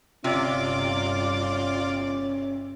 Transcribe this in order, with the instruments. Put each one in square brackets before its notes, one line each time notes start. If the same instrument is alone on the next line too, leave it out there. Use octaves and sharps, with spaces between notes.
[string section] G1 D6 [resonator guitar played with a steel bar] C3 [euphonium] C#4 [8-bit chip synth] F4 D5